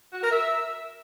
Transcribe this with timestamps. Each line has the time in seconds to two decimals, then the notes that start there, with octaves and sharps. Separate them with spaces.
0.13 F#4
0.22 A#4
0.32 E5